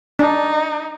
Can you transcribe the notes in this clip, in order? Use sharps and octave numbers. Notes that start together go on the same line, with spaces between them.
D4 D#4